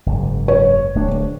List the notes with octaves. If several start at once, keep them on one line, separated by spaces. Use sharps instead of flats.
F#1 G#2
C#5
D1 A3 D4